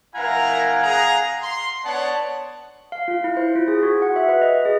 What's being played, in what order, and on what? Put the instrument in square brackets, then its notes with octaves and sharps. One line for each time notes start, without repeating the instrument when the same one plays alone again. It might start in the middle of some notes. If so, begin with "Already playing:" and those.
[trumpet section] E4 A#4 A#5 [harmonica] F5 F#5 G#5
[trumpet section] G#4 A#5
C6
[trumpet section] B3 C#5 F#5 [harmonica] D5 A5
[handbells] F5
F4
E4
C5
F4
G#4
F#4
F#5
E5
B4
D#5
G#4